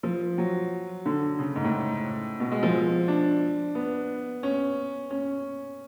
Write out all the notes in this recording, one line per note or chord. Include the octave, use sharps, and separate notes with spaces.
F3
F#3
D3
C#3
G#2
A2
B2
G#3
F3
D4
B3
C#4
C#4